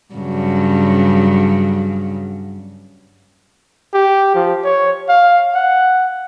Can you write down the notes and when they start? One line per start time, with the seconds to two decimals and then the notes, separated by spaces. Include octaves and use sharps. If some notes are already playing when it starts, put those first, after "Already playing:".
0.14 G2 C#3 F#3
3.93 G4
4.35 F3
4.64 C#5
5.09 F5
5.54 F#5